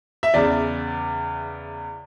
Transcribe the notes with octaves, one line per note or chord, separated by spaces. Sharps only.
E5
E2 C#3 E3 D5